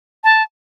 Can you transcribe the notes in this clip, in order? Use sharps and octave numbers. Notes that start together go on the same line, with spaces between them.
A5